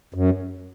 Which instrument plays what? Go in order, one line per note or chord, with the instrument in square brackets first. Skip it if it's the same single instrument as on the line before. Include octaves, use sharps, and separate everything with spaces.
[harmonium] F#2